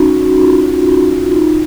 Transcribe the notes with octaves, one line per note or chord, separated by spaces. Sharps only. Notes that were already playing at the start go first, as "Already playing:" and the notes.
Already playing: C#4 D#4 F#4
F#4
F#4
F4
F#4
F4
D#4